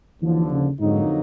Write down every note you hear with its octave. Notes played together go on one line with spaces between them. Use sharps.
D#2 D3 E3 F3
C#3
F2 G#2 D3 F#3 A#3 D#4